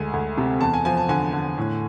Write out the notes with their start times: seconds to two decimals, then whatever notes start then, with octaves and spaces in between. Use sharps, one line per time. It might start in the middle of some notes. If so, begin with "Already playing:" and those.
Already playing: D2 G#3 G#5
0.13 D2
0.37 C3
0.61 E2 A5
0.74 G#5
0.85 F3 G#5
0.97 A5
1.09 D3 G#5
1.33 D3
1.57 A2